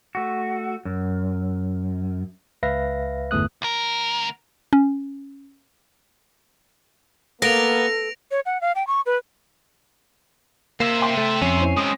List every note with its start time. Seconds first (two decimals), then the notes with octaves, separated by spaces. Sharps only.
0.15 A3 F#4
0.85 F#2
2.63 C#2 B4 E5 F5 A#6
3.31 G1 E2 E3 A3 D#6 F#6
3.62 D2 A#4
4.73 C#4
7.42 A#3 B3 A4 A#6 D7 F7
8.31 C#5
8.46 F#5
8.61 F5
8.76 G5
8.87 C#6
9.06 B4
10.80 A#3 C5 E5
11.02 G5 C6
11.17 A3
11.42 F2 C#4 C7
11.60 C4 E4
11.77 G#3 C4 D#6